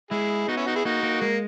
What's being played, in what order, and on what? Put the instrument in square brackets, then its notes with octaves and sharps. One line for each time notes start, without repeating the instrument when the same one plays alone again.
[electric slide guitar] G#3 [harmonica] E4 G#4
[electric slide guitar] B3 [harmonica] D#4 F#4
[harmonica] C#4 E4
D#4 F#4
E4 G#4
[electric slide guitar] A#3 [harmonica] D#4 F#4
[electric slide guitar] A#3
[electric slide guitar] G#3 [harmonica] A#3